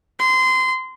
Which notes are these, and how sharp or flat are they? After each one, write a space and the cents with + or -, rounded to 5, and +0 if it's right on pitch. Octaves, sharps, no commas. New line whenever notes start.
C6 -20